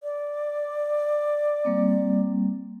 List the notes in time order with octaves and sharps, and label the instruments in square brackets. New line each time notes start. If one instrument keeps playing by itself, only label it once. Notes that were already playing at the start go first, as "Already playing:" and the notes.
[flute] D5
[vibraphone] G3 A#3 C4